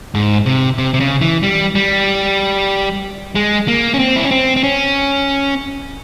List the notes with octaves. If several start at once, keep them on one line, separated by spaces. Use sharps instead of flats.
G#2
C3
C3
C3
C#3
E3
G3
G3
G#3
A#3
C#4
C4
E4
C#4
C4
C4
C#4